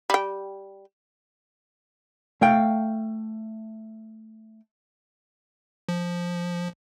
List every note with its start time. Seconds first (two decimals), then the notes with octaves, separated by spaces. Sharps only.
0.10 G3 G5
2.42 A3 F5 G5
5.89 F3